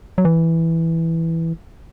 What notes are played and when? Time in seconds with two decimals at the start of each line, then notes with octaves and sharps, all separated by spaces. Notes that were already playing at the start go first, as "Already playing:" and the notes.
0.18 F#3
0.25 E3